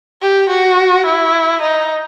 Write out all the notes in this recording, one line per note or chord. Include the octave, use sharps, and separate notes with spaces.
G4
F#4
E4
D#4